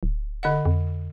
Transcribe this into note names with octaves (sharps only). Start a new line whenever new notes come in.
D1
D3 D#5 F#5
F2